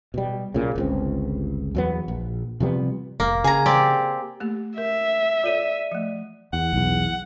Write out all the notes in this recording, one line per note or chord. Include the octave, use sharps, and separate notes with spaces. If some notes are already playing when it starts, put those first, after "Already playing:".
B2 G3
B1 A#2 C#3
G1 C#2 C4
E2 F#3 B3
A#1
C3 F3 G3 B3
F1 A#3
C#3 G#4 A#5
C4 G4 D5
A3 A#3 G4
A#4 E5
F4 A4 C#5 D5 D#7
F3 A3
E2 F#5
B1 E2